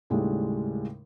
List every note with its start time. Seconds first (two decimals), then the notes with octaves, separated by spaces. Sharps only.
0.10 D#2 A2 C#3 G3 G#3